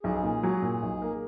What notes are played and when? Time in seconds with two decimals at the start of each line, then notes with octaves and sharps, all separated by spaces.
0.03 B1 G#4
0.23 A#2
0.43 F#3
0.62 A#2
0.82 B1
1.02 A#3